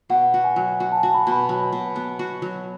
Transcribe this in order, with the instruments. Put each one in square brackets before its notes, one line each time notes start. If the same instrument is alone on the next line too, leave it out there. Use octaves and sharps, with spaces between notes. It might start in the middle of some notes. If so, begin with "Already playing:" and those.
[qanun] B2 [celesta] F#5
[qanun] F#4
[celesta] G#5
[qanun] F#3
F#4
[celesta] A5
G#5
[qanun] F#4
[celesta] B5
[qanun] B2
[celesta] B5
[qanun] F#3
B2
B3
F#4
F#3